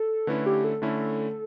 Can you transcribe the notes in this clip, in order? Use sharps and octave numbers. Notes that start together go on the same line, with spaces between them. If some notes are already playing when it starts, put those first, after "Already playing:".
Already playing: A4
D3 A3 C#4 E4 B4
G4
A4
D3 A3 C#4 E4